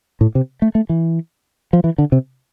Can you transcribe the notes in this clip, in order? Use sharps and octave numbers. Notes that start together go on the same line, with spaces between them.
A2
C3
A3
A3
E3
F3
E3
D3
C3